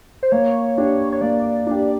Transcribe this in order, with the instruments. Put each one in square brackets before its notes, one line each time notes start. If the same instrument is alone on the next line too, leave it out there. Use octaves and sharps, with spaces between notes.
[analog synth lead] C5
[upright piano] A#3 [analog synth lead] C#5
[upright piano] D4 G4
[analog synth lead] C#5
[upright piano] A#3 [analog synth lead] D5
[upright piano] D4 G4